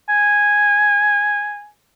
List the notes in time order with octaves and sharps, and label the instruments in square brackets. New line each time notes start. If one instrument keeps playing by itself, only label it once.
[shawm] G#5